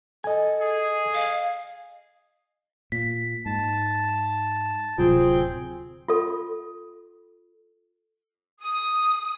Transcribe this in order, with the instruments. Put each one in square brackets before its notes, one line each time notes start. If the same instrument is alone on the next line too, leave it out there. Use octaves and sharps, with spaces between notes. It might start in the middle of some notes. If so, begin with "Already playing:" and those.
[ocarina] A4 [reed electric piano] D#5 G#5
[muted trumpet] G#4
[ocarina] D#5 [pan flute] F5
[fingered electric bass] A#2 [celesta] B6
[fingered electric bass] G#2 [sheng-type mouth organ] A5
[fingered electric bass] D1 C3 F#3 [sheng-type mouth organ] C4 G#4 G5 [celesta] F4
[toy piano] F4 A4
[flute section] D#6